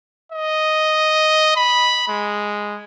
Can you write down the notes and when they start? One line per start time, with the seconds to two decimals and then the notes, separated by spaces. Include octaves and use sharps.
0.32 D#5
1.56 B5
2.08 G#3